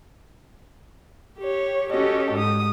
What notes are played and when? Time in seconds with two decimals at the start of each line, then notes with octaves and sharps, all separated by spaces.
1.38 G4 C#5
1.89 C#4 F#4 G4 A4 D#5
2.32 G#2 D#6